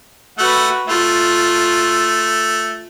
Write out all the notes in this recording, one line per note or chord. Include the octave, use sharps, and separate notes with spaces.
A3 F#4 B4 F#5
A3 F4